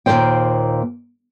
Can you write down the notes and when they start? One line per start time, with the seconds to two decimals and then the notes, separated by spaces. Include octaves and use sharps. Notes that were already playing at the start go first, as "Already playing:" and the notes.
0.06 D#2 A#2 A#3 A#4 C5 G5